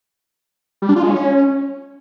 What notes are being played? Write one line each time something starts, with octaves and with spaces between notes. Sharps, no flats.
G3
D4
F4
G#3
C#4